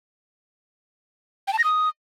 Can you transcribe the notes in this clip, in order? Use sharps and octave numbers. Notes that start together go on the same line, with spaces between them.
G5
A5
A#6
D#6